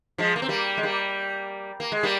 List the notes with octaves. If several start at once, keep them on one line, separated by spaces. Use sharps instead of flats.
F3 G#3
A#3
C4
G3 A#3
G#3
G3 A#3
A#3
G#3
G3 A#3